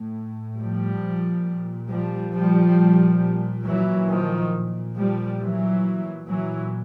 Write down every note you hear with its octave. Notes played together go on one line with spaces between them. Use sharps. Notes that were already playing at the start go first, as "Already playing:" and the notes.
Already playing: A2
F3 G3
A#2
F3 G3
F3 G3
A#2
E3 F#3
D#3 F3
A#2
F3 G3
E3 F#3
A#2 E3 F#3